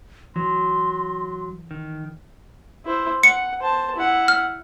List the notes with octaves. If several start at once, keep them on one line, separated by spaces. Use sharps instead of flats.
E3 F#3 C6
D#3
E4 C5
F#5 C#7
C5 A5
E4 F#5
F6